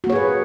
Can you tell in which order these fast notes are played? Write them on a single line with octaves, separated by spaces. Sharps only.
F#4 A#3 C#5 G#4 B4